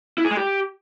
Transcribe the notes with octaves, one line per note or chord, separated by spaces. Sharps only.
E4
G#4
G#3
G4